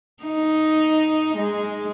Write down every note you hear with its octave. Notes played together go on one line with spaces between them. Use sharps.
D#4
G#3